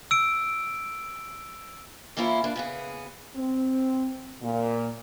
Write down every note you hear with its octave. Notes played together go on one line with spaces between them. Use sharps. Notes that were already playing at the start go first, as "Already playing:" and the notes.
E6 D7
E3 A#3 C#4 E4 F4
A#3 D4
C#3 B3 G#4
C4
A#2